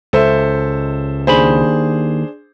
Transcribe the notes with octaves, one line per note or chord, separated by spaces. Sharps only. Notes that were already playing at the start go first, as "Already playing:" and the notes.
C#2 A4 C5 E5
D#2 D4 G#4 C5 B5